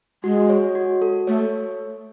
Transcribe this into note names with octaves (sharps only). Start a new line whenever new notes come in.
G#3 F#4
C#5
F#4
A4
A3 C#5